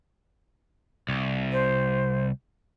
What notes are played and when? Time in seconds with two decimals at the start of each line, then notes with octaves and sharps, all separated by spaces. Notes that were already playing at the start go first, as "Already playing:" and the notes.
1.09 C2
1.52 C5